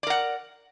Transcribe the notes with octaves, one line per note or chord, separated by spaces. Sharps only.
A#4 D5 F#5